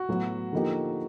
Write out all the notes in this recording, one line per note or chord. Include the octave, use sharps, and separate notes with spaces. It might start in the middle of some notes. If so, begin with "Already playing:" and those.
Already playing: F#4
A2 F#3 B3
D3 F3 A#3 D#4 G4